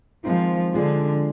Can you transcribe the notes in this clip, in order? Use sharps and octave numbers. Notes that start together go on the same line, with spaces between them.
D#3 F3 G#3 C4 D#4
D3 F3 G#3 D4 G#4